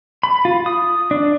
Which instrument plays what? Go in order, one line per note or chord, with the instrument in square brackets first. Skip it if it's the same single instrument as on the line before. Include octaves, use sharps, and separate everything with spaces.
[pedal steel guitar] B5
F4
D#6
D4